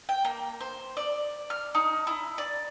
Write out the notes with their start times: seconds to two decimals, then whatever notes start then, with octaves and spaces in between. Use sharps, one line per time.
0.09 G5
0.25 A#3
0.61 C5
0.97 D5
1.50 F6
1.75 D#4
2.07 E4
2.38 D5